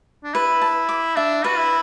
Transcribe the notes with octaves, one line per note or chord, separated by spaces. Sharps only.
D4
E4 B4
A5
D6
D4 E5
F#4 B4
E4